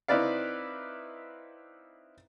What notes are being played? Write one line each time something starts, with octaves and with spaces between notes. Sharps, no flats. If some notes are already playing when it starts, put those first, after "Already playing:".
C4 D#4 E4 B4 D5 F5